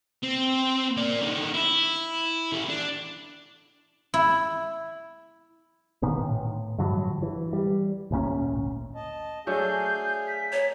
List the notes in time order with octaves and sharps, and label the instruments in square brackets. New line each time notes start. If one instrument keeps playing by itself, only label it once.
[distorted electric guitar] C4
A#3 D5
D3 D#3
E4
E3 A3
D4
[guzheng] E4
[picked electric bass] A#2 D3 D#3 B3
A2
G2 D3 F3 F#3
E3
G3
G#1 D2 A#2 C#4
[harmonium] D#5 A5
[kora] F#3 A3 D4 [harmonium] G#4 F5 G#5 [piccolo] G6
[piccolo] B6
[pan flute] C#5 [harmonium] A#5